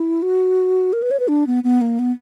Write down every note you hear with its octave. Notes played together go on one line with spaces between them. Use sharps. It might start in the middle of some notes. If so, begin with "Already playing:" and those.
Already playing: E4
F#4
A#4
B4
C#5
B4
D4
B3
B3
A#3
B3